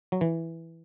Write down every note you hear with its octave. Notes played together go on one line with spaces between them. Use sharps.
F#3
E3